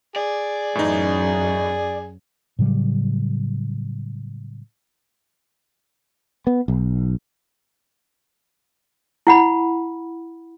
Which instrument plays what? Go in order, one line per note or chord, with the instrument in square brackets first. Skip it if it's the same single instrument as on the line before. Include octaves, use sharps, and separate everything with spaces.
[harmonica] G#4 [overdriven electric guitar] D5
[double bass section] F#2 [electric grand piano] A2 E3 D#4
[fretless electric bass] A2 C#3 F#3 G3
B3
B1
[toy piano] E4 F#5 B5